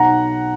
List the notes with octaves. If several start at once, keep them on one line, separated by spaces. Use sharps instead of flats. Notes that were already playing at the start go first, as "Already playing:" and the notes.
Already playing: B1 F#5 A#5